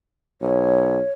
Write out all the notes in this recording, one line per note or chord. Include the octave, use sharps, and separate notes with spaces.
B1 C#5